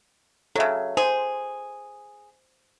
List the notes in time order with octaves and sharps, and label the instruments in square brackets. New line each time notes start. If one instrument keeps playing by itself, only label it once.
[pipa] C#3 F#3 [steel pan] A4 E5
[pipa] G#4 [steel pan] C5